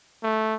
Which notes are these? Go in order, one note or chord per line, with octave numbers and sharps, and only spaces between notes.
A3